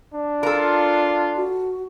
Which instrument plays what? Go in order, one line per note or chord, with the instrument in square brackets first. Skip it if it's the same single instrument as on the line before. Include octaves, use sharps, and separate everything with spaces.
[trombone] D4
[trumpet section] F4 [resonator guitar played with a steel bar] A4 A#4
[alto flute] F#4